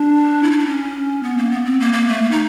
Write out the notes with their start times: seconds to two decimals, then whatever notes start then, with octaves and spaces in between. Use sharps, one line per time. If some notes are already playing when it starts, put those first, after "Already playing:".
Already playing: D4
0.43 E4
0.51 D#4
0.59 D4
0.66 C#4
1.23 B3
1.38 A#3
1.51 B3
1.65 C4
1.80 A#3
1.93 A#3
2.08 A3
2.22 A#3
2.31 D#4